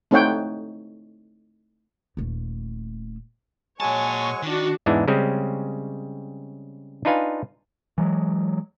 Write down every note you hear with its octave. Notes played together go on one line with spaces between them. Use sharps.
A3 C4 D#4 C#5 F#5 G5
D#1 A3
A#2 F#3 G#3 C#5 G#5 A5 C#6
D#3 D4 F#4
E2 G#2 E3 G#3 D4
C#3 G3 G#3 C4 C#4
D4 D#4 F4 B4 F5 G#5
E3 F#3 G#3